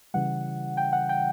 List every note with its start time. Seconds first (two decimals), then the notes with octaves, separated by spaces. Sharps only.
0.14 C#3 E3 G3 F#5
0.77 G5
0.93 F#5
1.09 G5